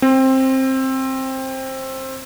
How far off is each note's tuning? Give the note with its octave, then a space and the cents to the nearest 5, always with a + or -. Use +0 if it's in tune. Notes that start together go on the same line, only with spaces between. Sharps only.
C4 +15